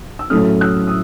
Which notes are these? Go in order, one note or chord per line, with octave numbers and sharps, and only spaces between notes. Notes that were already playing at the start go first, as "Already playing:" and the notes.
E6
A2 F#3 A3 C#4 D#6 F6
E6 F#6
D#6